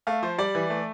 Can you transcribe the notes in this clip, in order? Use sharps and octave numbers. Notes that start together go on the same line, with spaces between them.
A3 F5
F3 C5
G3 D5
E3
A3